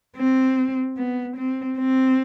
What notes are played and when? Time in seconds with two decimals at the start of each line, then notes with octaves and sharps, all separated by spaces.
0.17 C4
0.97 B3
1.37 C4
1.78 C4